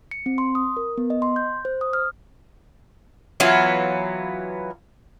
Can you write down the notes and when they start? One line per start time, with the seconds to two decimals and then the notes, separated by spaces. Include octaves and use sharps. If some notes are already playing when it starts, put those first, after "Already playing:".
0.11 C#7
0.26 C4
0.38 C6
0.55 D#6
0.77 A#4
0.98 B3
1.10 D#5
1.22 C6
1.36 G6
1.65 C5
1.81 D#6
1.93 F6
3.40 E3 F#3 B3 F4